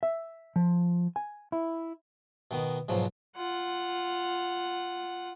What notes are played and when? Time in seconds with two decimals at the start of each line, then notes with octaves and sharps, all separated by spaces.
0.03 E5
0.56 F3
1.16 G#5
1.52 E4
2.51 B2 D#3 B3
2.89 G#2 B2 F3 F#3
3.36 F4 F#5